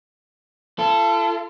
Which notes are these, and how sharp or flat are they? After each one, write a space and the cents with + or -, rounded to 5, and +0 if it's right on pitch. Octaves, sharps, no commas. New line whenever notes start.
F4 -45 A4 +0